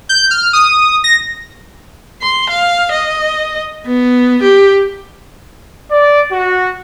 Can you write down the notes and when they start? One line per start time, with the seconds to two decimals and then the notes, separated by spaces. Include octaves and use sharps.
0.09 G6
0.31 F6
0.53 D#6
1.04 A#6
2.21 C6
2.50 F5
2.92 D#5
3.86 B3
4.43 G4
5.90 D5
6.31 F#4